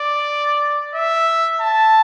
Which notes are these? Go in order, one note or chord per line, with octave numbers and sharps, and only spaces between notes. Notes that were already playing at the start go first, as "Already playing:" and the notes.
Already playing: D5
E5
A5